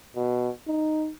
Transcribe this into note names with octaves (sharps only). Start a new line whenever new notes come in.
B2
D#4